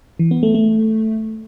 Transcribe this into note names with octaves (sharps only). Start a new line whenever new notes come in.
E3
B3
A3
A3